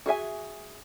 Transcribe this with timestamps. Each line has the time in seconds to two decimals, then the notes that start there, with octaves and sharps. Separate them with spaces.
0.06 F#4 G#4 E5 G#5